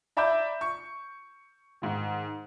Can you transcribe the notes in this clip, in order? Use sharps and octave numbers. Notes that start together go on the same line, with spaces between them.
D5 E5 A#5 B5 D6 G6
C#6
G#2 D#3